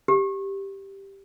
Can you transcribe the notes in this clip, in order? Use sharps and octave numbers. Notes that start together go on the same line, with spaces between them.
G4